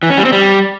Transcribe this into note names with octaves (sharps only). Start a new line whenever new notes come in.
E3
C#4
G3
C4
G3